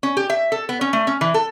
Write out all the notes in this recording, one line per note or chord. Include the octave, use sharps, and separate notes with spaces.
C#4
G4
E5
A4
B3
C#4
A3
C#4
E3
A4